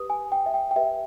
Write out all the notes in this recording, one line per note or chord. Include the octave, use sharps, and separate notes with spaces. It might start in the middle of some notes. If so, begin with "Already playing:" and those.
Already playing: G4 B4 D#6
G#5
G5
E5
G5
G5
G4 B4 E5